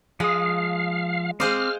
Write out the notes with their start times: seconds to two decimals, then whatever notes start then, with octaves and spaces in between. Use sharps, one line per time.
0.20 F3 G#3 F5 D#6
1.40 G#3 C4 G#4 C5 F5 D6 F6